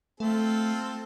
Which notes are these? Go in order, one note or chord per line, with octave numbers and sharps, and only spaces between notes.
A3 C4 F4 A4